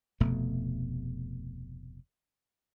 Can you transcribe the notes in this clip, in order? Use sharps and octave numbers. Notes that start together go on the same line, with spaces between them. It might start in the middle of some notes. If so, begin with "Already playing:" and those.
F1 D2 B2 A3